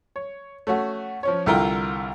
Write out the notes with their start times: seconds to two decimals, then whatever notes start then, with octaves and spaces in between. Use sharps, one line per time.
0.16 C#5
0.67 A3 C#4 F#4
1.23 F3 C#4 C#5
1.46 C2 D3 E4 F4 A#4 G5